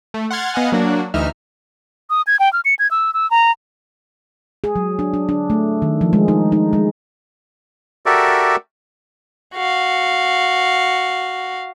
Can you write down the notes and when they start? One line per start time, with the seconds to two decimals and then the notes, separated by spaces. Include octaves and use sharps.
0.14 A3
0.31 F#5 C6 F6 G#6 A6
0.54 B3 D#5 F5 F#5 G#5
0.72 F#3 A#3 D4 F#4
1.14 D2 E3 D#4 E5 F6
2.10 D#6
2.27 G#6
2.39 G5
2.53 F6
2.65 C#7
2.79 G#6
2.91 E6
3.14 E6
3.31 A#5
4.64 G#4
4.76 F#3
4.99 D4
5.14 D4
5.29 D4
5.50 A3
5.82 D#3
6.01 F3
6.13 G#3
6.28 D#4
6.52 D#4
6.73 G#3
8.06 F#4 G4 A4 A#4 D5 E5
9.54 F#4 F5